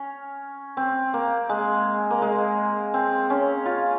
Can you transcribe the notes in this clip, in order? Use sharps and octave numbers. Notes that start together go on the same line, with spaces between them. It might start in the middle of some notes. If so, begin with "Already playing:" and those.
Already playing: C#4
C4
A#3
G#3
A#3
G#3
C4
C#4
F4